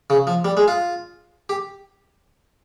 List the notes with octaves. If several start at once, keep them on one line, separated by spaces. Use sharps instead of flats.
C#3
F3
G3
G#3
F4
G4